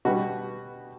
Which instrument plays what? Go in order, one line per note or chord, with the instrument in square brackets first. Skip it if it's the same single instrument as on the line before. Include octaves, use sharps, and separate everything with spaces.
[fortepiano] B2 G3 B3 F#4